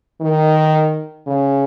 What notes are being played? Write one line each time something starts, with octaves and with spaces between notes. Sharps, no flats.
D#3
C#3